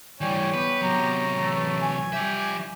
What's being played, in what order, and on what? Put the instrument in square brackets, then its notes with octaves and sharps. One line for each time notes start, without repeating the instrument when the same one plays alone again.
[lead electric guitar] E3 G3 [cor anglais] C#5 [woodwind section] D5 G5 G#5
[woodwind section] B3 G4 [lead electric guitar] B4
[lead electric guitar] C3 F#3 [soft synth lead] A#5
[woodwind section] E3 A3
[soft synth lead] G#5
[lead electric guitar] F3 E5 [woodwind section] G3 G4